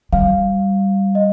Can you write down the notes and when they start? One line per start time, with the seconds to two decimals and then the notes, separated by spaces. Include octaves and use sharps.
0.13 G3 F5
1.15 D#5